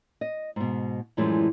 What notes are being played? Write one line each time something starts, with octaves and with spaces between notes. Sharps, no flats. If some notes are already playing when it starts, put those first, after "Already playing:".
D#5
G#2 B2
F#2 A2 E3 F3 G3 G#3